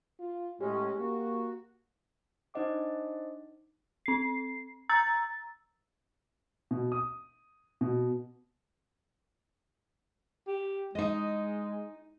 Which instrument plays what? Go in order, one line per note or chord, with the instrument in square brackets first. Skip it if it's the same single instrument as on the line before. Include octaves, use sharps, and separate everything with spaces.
[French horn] F4
[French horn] A2 [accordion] G#3 C#4 [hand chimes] G4
[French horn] A#3 [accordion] F#4
[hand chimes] D4 D#4 C5 D#5 F#5 D6
[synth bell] C4 C7
A#5 E6 A6
[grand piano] B2
D#6
B2
[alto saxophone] G4
[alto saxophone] G#3 [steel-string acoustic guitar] D#4 D#5